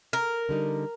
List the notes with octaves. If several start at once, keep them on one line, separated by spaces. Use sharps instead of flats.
A#4
D3 G3 D#4